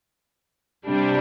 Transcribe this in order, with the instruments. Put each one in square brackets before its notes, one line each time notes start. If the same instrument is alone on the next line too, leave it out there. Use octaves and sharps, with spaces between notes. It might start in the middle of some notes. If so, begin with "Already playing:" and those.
[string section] C3 G3 D4